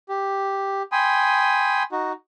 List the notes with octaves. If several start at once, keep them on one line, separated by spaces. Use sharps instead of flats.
G4
G5 G#5 B5 C6 D#6
D#4 F#4